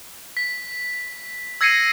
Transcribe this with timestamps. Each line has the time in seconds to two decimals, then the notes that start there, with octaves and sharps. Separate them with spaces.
0.37 B6
1.61 E6 G#6 A#6 C7 C#7 D#7